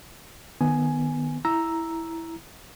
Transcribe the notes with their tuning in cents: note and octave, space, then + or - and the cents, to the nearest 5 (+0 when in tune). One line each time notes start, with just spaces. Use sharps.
D#3 -25 B3 +0 G#5 +10
E4 +0 A#5 +0 E6 +0